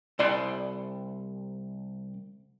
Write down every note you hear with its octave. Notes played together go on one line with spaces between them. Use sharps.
C2 D5 C6